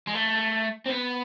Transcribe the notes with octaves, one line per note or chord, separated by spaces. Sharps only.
G#3
A3
C4
B3